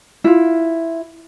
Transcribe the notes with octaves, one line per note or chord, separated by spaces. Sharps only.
E4 F4